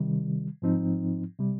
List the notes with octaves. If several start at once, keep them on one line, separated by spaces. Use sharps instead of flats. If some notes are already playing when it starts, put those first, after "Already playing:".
Already playing: C3 D#3 G3
G#2 F3 C4 D#4
C3 G3